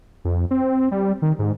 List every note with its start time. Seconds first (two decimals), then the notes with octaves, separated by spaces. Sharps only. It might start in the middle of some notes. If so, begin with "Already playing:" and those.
0.25 F2
0.51 C4
0.91 G3
1.22 D#3
1.39 G#2